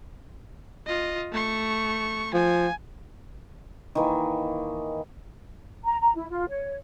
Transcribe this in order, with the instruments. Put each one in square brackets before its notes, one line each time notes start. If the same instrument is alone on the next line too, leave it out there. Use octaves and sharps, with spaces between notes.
[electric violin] F4 D#5
A3 C#6
[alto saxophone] F3 [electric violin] G#5
[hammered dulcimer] D#3 E3 A#3
[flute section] A#5
A#5
E4
F4
C#5